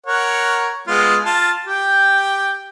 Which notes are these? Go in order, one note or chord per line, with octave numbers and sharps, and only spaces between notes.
A#4 C#5 F#5
G#3 B3 F4
F4 A5
G4 G5